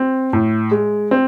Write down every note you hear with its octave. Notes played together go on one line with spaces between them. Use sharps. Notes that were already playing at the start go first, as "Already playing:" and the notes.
Already playing: C4
A2
G#3
C4